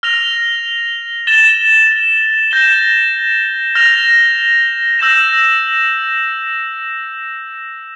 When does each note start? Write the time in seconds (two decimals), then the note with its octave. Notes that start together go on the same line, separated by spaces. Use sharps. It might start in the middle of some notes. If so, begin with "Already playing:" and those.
0.03 F6 A#6 F7
1.27 A6 E7 G7
2.51 G6 A#6 E7 G7
3.75 F6 A#6 F7
4.99 E6 G6 A#6 E7